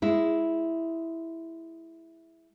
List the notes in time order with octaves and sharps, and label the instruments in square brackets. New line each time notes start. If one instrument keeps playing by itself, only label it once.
[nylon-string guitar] G#3 E4